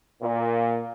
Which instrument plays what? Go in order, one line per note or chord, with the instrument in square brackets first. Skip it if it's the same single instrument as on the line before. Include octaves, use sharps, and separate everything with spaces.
[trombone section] A#2